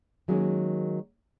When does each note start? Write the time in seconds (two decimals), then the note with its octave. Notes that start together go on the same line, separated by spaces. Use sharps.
0.28 D#3 F#3 G#3 A#3 C#4